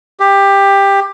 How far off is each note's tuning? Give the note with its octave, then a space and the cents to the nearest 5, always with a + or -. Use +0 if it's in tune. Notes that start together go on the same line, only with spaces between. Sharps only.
G4 +15